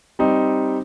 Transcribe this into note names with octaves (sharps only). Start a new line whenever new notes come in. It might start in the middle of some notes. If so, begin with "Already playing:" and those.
G3 C4 D#4